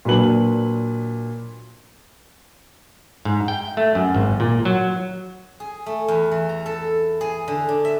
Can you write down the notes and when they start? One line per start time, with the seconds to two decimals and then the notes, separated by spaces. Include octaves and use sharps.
0.05 A#2 F#3 D4 B4 F#7
3.25 G#2
3.48 G5
3.77 A3
3.95 F#2
4.15 G#1
4.40 A#2
4.65 F#3
5.60 G#4
5.86 A3
6.08 E2
6.31 E3
6.49 A#5
6.66 A4
7.21 G#4
7.48 D3
7.69 D4
7.85 E5